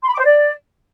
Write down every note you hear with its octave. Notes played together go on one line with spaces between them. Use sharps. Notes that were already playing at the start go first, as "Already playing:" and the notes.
C6
B5
D6
C5
D5